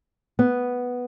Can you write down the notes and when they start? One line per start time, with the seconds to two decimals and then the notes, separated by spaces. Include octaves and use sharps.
0.39 B3